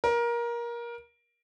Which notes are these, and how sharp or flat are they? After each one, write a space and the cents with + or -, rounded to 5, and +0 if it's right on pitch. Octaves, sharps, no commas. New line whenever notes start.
A#4 +20